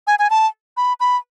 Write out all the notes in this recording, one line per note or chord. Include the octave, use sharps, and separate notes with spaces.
G#5
G#5
A5
B5
B5